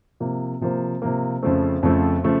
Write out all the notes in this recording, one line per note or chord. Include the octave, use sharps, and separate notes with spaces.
C3 F3 A#3
C3 F3 A#3
C3 F3 A#3
F2 C#3 F3 A3 C4
F2 C#3 F3 A3 C4
C#3 F3 A3